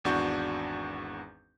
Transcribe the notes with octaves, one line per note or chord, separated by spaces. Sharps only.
G#1 E2 D4 F#4 C#6 G6